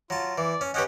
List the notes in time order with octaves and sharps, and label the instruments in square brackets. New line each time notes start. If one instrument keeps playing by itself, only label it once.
[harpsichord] F#3 A5 [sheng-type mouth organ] F4
[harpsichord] E3 [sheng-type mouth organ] D5
[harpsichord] C#4
[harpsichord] C#4 G4 B4 [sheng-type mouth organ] C#5 D#5 F#5